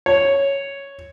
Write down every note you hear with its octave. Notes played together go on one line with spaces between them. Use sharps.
C#5